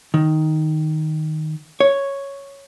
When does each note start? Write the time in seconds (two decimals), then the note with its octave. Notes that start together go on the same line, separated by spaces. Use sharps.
0.14 D#3
1.81 C#5